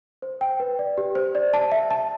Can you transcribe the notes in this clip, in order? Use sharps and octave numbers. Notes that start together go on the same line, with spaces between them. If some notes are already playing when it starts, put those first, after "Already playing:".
C5
G5
B4
D5
G4
C5
D5
A5
E5
A5